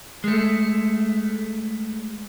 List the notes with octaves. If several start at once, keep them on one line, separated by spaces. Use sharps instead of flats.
G#3 A3